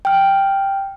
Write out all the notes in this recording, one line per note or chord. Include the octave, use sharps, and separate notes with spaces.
G5 F6